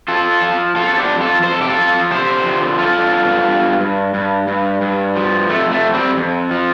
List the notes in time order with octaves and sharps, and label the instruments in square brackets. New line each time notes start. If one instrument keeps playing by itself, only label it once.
[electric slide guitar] F3 F4 A4
F3
F3 F4 A4
A4
D4 G4
F2
F4 A4
F2 C5
A4
G4
F4 A4
F3
D3 G4 C5
F3
G2 F4 A4
G2
G2
G2
G2
G2
G2
F3
F2 A3
A3
F2
G3 C4
F2
F3